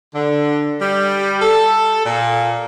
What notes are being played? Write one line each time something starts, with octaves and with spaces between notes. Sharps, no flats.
D3
G3
A4
A#2